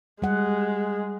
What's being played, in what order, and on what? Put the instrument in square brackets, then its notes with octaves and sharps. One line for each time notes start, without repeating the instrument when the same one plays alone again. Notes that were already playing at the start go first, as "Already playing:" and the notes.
[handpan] G3 F#5 [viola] G#3